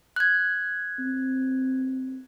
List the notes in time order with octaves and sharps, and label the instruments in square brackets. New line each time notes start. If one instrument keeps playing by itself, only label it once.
[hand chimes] F#6 G#6
[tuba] C4